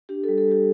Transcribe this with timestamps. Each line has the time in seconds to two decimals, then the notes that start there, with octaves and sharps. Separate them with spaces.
0.09 D4 G4
0.23 G3 A4
0.38 A4
0.47 G3 G4